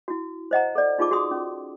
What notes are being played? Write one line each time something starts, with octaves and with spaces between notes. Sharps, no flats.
E4 F#4
C5 D#5 F#5 A#5
A4 D5
D#4 F4 G#4 A5 D6
F#4 G#4 A5 C6 D#6
C#4